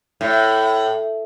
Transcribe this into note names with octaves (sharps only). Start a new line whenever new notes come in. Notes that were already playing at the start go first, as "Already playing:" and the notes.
A2